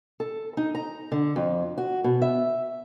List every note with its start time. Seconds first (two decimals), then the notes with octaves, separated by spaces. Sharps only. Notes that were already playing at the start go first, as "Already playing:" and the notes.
0.20 A4
0.57 D#4
0.75 A#5
1.12 D3
1.36 F2
1.78 F#4
2.04 B2
2.22 E5